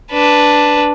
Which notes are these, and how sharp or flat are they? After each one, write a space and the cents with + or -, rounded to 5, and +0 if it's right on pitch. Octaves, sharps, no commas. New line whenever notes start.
D4 +0 B4 +0